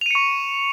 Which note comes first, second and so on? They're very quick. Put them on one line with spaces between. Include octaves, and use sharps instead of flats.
F7 D#7 C#7 C#6